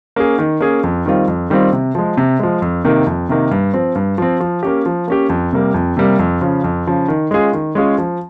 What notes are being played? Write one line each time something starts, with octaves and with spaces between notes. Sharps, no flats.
A#3 C#4 G#4
D#3
A#3 C#4 G#4
F2
D#3 G3 C4 F4
F2
D#3 G3 C4 F4
C3
F3 G#3
C3
F3 G#3
F2
C3 D#3 A#3
F2
C3 D#3 A#3
G2
F3 C4
G2
F3 C4
F3
A#3 C#4 G4
F3
A#3 C#4 G4
F2
C3 G3 A#3
F2
C3 G3 A#3
F2
C#3 F3
F2
C#3 F3
D#3
G#3 C#4 F4 G#4
D#3
G#3 C#4 F4 G#4
F3